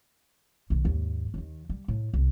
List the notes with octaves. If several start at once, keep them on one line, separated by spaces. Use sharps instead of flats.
B1 D#3
D#2 G#2
D#2 D#3
G3
A2
C2